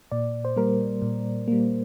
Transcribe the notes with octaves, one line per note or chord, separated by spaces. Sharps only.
A#2 D5
C5
G3 A#3 A#4
A#2
G3 A#3